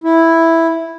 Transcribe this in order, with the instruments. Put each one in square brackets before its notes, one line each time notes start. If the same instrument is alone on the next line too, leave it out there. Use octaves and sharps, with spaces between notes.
[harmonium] E4